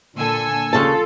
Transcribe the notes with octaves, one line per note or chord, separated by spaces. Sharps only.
A#2 D3 A4 G#5 E6
D#2 C#3 F4 A4 A5